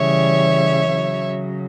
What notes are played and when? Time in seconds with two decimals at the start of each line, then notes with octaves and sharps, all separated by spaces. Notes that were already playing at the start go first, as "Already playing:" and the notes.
Already playing: C#3 E3 G3 C#5 E5
0.89 C#3 F#3